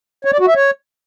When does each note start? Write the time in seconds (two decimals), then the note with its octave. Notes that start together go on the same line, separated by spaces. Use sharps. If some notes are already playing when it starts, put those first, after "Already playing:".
0.25 C#5
0.32 D5
0.40 F#4
0.48 E5
0.55 C#5